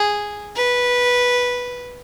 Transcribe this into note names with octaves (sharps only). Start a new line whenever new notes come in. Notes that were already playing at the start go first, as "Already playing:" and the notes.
Already playing: G#4
B4